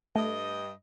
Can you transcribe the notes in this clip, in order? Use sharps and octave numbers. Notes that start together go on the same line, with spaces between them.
G2 A3 D#5